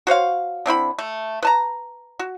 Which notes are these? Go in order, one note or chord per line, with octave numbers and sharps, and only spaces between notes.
F#4 C5 C#5 F5
D3 C4 E4 B5
A3
B4 A5 A#5
F#4